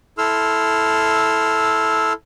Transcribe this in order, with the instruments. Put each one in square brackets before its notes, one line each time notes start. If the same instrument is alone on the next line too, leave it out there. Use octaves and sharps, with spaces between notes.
[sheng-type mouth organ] E4 A4 C6 E6 F6